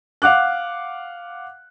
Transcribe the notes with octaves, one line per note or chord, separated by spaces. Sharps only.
F5 F#5 D6 F#6